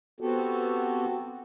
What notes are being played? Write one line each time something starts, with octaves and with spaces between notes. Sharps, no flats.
B3 C4 F#4 G4 A4